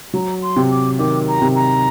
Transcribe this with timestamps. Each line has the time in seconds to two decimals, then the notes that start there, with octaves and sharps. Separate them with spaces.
0.14 F#3 A#5
0.42 C6
0.56 C3
0.71 D6
0.99 D#3 D6
1.27 A#5
1.42 C3
1.55 A#5